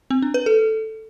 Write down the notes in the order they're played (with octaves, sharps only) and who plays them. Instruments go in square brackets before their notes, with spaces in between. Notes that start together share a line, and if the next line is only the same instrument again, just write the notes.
[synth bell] C4
D4
B4
A4